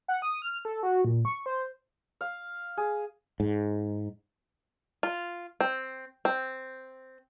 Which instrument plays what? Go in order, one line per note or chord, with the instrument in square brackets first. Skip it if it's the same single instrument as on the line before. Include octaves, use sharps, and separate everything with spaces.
[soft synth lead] F#5
D#6
F6
A4
F#4
A#2
C#6
C5
[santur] F5
G#4
[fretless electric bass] G#2
[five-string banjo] F4
C4
C4